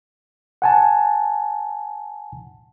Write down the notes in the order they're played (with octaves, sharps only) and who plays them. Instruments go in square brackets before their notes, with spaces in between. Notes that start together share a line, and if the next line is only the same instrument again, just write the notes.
[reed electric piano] F#5 G#5 A5